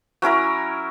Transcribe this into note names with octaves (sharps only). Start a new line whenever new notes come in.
F#3 C#4 E4 A#4